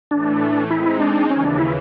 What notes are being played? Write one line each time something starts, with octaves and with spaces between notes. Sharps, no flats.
A2 E3 A3 D4
G#3 C4 D#4 E4
D4
D#2 C#3 E3 C#4
D4
E4